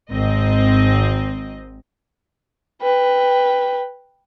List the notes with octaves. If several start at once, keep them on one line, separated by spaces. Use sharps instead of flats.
G#1 G#2 C4 D#5
B4 G5